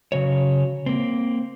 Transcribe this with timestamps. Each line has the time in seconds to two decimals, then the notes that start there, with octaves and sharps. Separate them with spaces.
0.12 C#3 F#3 C#5
0.86 A#3 C4